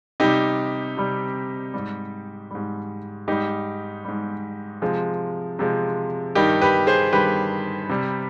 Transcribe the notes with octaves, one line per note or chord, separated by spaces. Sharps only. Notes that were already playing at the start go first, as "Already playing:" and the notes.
C3 G3 D#4 G4
C3 G3
G#2 G3
G#2 G3
G#2 G3 D#4 G4
G#2 G3
C3 F3 G#3
C3 F3 G#3
G2 D#3 G3 D#4 G4
G4 B4
G#4 C5
G2 D#3 G3 G4 B4
C3 G3